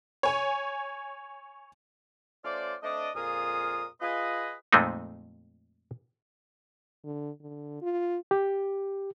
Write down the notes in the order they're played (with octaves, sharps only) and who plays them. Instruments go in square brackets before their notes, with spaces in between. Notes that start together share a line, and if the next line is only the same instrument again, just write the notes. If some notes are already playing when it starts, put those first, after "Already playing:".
[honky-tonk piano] C#5 G#5
[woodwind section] A3 C#4 F4 C5 D5
A3 C4 D4 D5 D#5
F2 A#2 F4 G#4 A#4 D#6
F4 G#4 B4 D#5
[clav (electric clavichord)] F2 A#2 G#3 A3 C4 D#4
[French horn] D3
D3
F4
[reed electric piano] G4